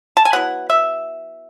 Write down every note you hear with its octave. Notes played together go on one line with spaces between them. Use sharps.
A5
G#5
F#3 B3 E4 F#5
E5